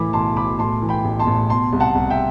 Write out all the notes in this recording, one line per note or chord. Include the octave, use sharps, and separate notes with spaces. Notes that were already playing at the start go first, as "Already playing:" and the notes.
Already playing: A2 E3 B5 D6
B1 A5 C6
B1 B5 D6
A2 A5 C6
E3
G5 B5
A1
A5 C6
A1
B2 A5 C6
C2
F#5 A5
C2
E5 G5